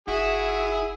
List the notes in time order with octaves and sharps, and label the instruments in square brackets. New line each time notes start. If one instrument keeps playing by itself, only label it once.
[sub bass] F#1 [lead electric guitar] E4 [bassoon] F#4 [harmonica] G#4